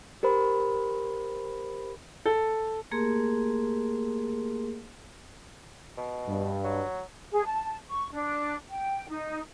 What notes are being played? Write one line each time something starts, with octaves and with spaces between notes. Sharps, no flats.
G4 A#4 C5 B5
A4
A3 A#3 G4 G#4 A#4 C6
B2
G2
F#3
G#4
A5
C#6
D4
G5
D#4